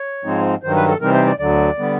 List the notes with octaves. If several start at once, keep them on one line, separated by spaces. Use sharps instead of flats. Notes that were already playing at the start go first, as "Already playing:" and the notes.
Already playing: C#5
G#2 F3 G#3 C4 D#4
G2 D#3 F#3 C5
B4
A4
C3 E3 G3 C4 D#4 A#4
C5
D5
D2 D3 F#3 D5
D3 G3 B3